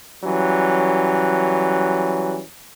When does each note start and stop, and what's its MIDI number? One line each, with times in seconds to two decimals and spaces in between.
0.24 2.42 52
0.24 2.42 54
0.24 2.42 55
0.24 2.42 61